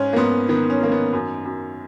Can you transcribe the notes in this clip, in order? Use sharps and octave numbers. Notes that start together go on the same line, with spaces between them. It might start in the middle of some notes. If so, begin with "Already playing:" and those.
Already playing: G#2 C#4
A#3
G#2 B3
D#3 B3
C#4
D#3 A#3
B3
F#2
F#2